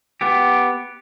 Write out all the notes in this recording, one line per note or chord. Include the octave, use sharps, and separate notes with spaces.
B3 G4